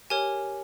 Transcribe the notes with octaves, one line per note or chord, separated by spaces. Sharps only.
G4 A#4 C#5 G#5